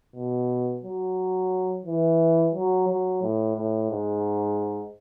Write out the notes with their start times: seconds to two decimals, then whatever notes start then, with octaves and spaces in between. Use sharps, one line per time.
0.15 B2
0.84 F#3
1.86 E3
2.54 F#3
2.88 F#3
3.22 A2
3.56 A2
3.90 G#2